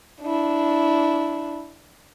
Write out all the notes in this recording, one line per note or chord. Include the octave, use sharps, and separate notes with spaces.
D4 E4